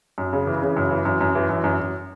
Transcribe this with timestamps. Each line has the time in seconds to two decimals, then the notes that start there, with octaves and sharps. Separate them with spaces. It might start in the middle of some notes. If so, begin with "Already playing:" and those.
0.18 F#2
0.33 C#3
0.47 E3
0.62 C#3
0.77 F#2
0.91 E3
1.05 F#2
1.21 F#2
1.35 E3
1.49 F#2
1.64 F#2
1.79 F#2